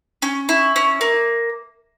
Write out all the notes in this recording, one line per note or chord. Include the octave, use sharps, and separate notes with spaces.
C#4
E4
C#4
A#3